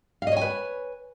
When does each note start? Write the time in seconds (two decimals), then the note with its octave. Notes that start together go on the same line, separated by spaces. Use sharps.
0.22 F5
0.27 D#5
0.32 C#5
0.37 G#5
0.41 B4